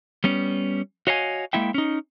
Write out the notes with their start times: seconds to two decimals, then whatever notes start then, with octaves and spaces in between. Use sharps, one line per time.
0.24 G3 B3 C#4
1.07 F#4 C#5 D#5 F5 G5 G#5
1.53 G#3 A#3 E4 E5 G5
1.74 C#4 D#4